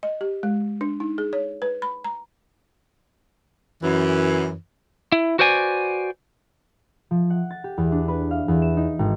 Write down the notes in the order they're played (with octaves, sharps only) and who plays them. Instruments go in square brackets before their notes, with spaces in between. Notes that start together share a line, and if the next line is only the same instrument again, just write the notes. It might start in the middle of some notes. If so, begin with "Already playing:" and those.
[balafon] D#5
G4
G#3
D4
D#4
G#4
C#5
B4
B5
A#5
[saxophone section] F#2 E3
[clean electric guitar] E4
F#4 B4 C5 D5 G#5
[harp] F3
F#5
A6
G4
E2
D4
B4
F5
E2
E7
D#4
G#1